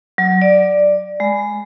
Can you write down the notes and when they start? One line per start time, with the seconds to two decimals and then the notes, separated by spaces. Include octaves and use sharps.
0.18 F#3
0.42 D5
1.20 G#3